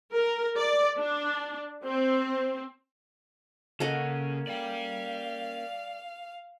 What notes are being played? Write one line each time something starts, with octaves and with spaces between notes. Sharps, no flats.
A#4
D5
D4
C4
C#3 A#3 C#4 A4 D#5 F#5
D5 F5 G5